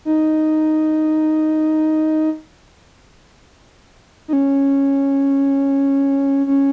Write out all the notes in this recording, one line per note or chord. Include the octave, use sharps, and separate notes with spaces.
D#4
D#4
C#4
C#4